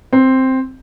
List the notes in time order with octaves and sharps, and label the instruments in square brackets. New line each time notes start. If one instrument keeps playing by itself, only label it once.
[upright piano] C4